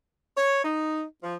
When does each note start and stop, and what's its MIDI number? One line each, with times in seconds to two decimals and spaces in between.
0.37 0.63 73
0.65 1.04 63
1.24 1.35 53